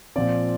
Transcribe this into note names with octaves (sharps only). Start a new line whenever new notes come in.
A#2 F3 C4 D5